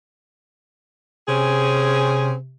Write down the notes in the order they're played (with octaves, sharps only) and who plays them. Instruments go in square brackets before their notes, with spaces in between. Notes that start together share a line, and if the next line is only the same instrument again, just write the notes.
[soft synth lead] C3 [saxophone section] C4 C#4 G#4